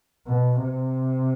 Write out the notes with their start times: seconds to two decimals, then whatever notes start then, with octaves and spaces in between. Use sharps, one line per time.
0.27 B2
0.64 C3